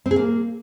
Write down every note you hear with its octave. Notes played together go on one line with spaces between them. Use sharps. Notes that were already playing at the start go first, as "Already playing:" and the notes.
C4
G#4
A#3